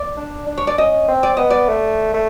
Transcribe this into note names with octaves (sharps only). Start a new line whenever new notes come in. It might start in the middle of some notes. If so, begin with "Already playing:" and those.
Already playing: D5
D4
D4
C#5
D5
C#4 D#5
C4
D5
C4
B3 D#5
D5
A3
A3